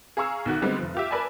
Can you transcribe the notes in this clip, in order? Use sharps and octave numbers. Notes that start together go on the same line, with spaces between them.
G#4 F5 A#5 C#6 E6
B1 D#3 F#4 F#6
D3 G3 G#3 B3 C4
F1 F3
F4 G4 E5
A#4 B4 D5 E5 G#5 A5